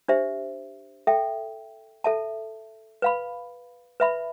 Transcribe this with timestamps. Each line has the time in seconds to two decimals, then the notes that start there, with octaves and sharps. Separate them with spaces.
0.08 D4 G4 C5 E5
1.07 A4 E5 G5
2.04 A4 E5 A5
3.02 B4 F5 B5
4.00 B4 E5 B5